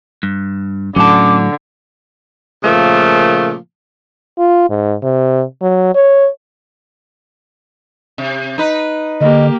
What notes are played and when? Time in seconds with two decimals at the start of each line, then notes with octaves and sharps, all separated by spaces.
0.23 G2
0.96 A2 D3 F#3 C#4 A5 D6
2.63 A#2 C#3 F3 A3 A#3
4.38 F4
4.70 G#2
5.03 C3
5.62 F#3
5.95 C#5
8.18 C3
8.58 D#4 B4
9.21 D3 A#3 G4 D#5